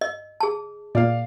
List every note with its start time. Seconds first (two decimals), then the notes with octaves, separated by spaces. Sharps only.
0.01 D#5
0.40 G#4 A5
0.95 A#2 A#3 D5 F5